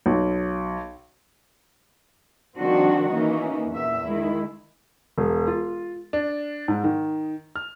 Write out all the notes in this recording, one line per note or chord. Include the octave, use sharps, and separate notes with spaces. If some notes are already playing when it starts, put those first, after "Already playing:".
B1
D#3 F3 G3 C4 D4 F#4
E3 A#3 C#4 D#4
E2 A#2 E5
D#3 G#3 E4
E1
F4
D4
G#2
D#3
F6